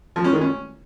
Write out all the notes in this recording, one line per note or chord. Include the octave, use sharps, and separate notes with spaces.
F3
C#4
D#3
C#4